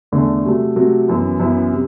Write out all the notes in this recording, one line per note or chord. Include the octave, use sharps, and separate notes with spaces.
E2 D3 A3
C3 F#3 A3
C3 F#3 A3
F#2 E3 B3 E4
F#2 E3 B3 E4
C3